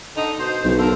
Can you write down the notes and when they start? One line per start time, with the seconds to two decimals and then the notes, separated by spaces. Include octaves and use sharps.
0.16 D3 D#4
0.39 B2 C5
0.64 B1 C#3
0.77 D3 A4 A#4